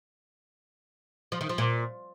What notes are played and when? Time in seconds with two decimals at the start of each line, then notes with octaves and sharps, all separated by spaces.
1.32 F3
1.41 D#3
1.49 F3
1.58 A#2